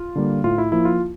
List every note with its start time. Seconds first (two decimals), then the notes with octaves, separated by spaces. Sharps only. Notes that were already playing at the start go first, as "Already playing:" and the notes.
Already playing: F4
0.16 D3 G3 A#3
0.44 A2 F4
0.58 E4
0.72 F3 A#3 E4
0.85 F4